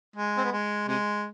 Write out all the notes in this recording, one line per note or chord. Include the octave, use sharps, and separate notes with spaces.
G#3
C4
B3
G#3
C3 G#3